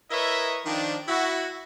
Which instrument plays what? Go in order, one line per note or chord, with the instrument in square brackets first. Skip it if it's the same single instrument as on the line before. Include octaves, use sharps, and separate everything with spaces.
[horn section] E4 A#4 B4 C#5 D#5 E5
D#3 F3 D4
E4 F#4